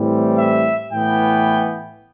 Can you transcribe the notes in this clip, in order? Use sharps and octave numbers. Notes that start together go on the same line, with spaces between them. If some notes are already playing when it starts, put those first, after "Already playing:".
Already playing: A2 E3 G3 C4
E5
A2 E3 B3 G5